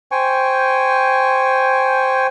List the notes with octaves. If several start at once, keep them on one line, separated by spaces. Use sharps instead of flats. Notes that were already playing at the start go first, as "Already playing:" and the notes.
C5 G5 G#5 C#6